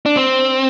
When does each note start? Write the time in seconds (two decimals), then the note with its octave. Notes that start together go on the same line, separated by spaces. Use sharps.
0.06 D4
0.17 C4